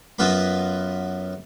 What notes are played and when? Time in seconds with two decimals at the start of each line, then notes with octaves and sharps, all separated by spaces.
0.19 F#2 F#3 B3 F4 B4 B5